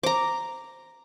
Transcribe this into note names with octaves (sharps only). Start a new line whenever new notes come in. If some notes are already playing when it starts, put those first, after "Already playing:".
C5 A#5 D6